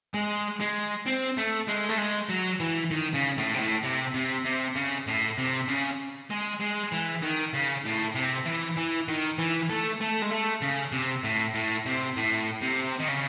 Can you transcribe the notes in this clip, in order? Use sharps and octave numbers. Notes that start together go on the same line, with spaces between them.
G#3
G#3
C4
A3
G#3
A3
G#3
F#3
E3
D#3
C#3
A2
C3
A2
C3
C3
C3
C#3
A2
C3
C#3
G#3
G#3
E3
D#3
C#3
A2
C3
E3
E3
D#3
E3
A3
A3
G#3
A3
C#3
C3
A2
A2
C3
A2
C3
D#3
C#3